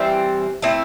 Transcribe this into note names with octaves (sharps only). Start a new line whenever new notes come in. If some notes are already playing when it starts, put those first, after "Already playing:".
Already playing: E3 G3 C4
A3 C4 E4